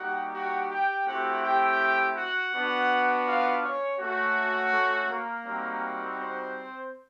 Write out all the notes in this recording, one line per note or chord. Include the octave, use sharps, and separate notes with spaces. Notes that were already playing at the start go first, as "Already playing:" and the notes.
Already playing: G3 A#3 D#4 F#4 G4 F#5
F#4 F#5
G4 G5
A3 C4 E4 F#4 G4 F#5
G4 G5
F#4 F#5
B3 D4 F#4
F4 F5
C#4 C#5
A3 C#4 F#4
A3 A4
A#3 A#4
G3 C4 D#4 F#4
C4 C5